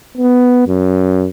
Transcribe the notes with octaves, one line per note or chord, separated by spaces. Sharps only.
B3
F#2